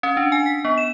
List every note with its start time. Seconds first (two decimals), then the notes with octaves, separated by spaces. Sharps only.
0.03 C#4
0.17 D4
0.32 G#5
0.46 B6
0.65 B3
0.78 E7